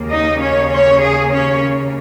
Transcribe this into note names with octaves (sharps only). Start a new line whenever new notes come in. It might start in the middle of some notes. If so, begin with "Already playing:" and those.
Already playing: D#2 C#3 A#3
D#4 D#5
C#4 C#5
C#4 C#5
G#4
C#4 C#5